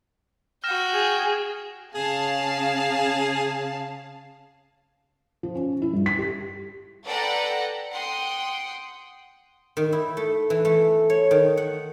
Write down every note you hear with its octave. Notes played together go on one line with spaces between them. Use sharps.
F#4 G5 F6 A#6 E7
G#4
C#3 G#4 F5 A5
F3
C#4
E4
G2
B6
G4
A4 B4 D5 F#5 G5 A#5
F#5 G5 C6 D#6
D#3
E4
A3
E3
A3
C#5
D#3
F#5